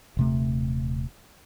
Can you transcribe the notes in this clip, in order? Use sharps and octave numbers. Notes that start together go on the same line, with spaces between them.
D#1 C3 A3